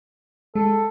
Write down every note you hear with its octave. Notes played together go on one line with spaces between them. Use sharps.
G#3 A4